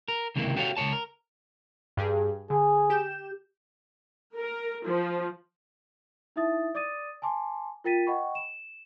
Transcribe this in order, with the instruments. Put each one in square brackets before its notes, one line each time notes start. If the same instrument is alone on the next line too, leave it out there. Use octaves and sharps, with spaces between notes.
[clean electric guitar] A#4
C#2 C3 D#3 E3 G3 A#3
F#4 G4 A4 C#5 D#5 F5
C#2 G2 C#5 A5
A#4
[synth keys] G2 G4 G#4
[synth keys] D3 [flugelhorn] G#4
[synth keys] G4 G6 E7
[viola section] A#4
F3
[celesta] D#4 E4 E5 D#6 A6
D5 D6 D#6 A6 D#7
G#5 A5 C6 D6
F4 A#4 G5 A6 B6 D#7
D#5 F#5 G5 B5 C#6
E7